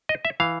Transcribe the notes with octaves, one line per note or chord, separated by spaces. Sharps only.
D#5
E5
E3 F5